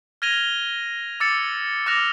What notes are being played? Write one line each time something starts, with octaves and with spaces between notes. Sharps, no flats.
F6 G#6 A#6 D#7 F7 G7
D6 E6 A6 C#7
D6 F6 F#6 A#6 F7